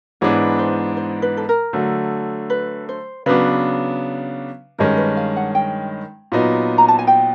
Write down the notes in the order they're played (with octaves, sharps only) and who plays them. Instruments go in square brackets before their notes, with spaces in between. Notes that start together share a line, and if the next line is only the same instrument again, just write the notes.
[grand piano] G#2 E3 G#3 B3 D4 [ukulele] C#5
[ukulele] C5
C5
B4
A4
A#4
[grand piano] D3 F#3 A3
[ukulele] B4
C5
[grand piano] C#3 F#3 B3 D4 [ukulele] B4
[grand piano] G2 D#3 G#3 C#4 [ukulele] A#4
[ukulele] B4
F5
F#5
G5
[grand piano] A#2 F#3 B3 D#4
[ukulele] A#5
A5
G#5
G5